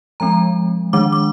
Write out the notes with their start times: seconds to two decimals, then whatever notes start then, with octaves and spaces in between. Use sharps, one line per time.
0.20 F3 G#3 C4 A#5
0.93 D#3 G#3 D4 D6
1.12 D6